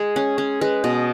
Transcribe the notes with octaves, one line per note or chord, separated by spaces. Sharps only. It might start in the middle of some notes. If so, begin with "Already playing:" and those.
Already playing: G#3 G#4
C#4
C#4
G#3 B4
B2 D#5